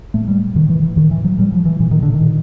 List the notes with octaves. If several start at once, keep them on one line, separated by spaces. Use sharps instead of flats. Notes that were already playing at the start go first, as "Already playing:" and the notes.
A2 A3
G3
A2 D#3
E3
E3
A2 D#3
E3
F#3
A2 G3
F3
E3
A#2 E3
D#3
D3
D#3
A#2